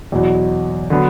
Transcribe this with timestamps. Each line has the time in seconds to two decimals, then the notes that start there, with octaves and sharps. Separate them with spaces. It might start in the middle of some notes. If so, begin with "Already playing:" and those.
0.12 E2 B2 F#3
0.90 D3 F#3 B3 D4